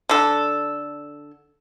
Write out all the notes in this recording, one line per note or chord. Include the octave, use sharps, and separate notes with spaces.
D3 A4